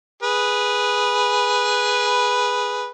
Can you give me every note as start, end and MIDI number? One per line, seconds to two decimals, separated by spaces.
0.23 2.92 68
0.23 2.92 71